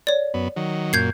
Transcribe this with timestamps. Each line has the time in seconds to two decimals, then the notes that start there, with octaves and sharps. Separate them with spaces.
0.07 C#5 D5
0.34 F#2 B3
0.56 D#3 F#3
0.93 F#2 A#2 G6 G#6 C7